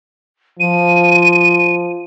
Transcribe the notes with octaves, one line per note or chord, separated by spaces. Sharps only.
F3 D#7